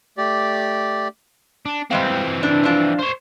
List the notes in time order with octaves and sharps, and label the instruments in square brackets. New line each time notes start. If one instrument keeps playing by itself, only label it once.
[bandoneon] A3 G4 D5
[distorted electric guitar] D4
[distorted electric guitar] E3 C4 [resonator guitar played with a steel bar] G3 G#3 F5
[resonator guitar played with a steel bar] D4
F3 D4 F4
[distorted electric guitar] C5 C#5